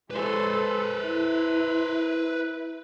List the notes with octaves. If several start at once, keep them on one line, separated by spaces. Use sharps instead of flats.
G#3 A4 B4 C5
E4